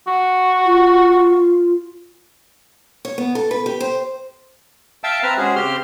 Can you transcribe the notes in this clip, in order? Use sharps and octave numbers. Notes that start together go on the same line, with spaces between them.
F#4
F4
C#5
B3
A4
B4
G4
C5
E5 F5 G5 A5 E6
C4 B4 E5 A5 A#5 F6
G#3 C#4 F#4 G#4 C5
C#3 C4 G4 C5 C6 F6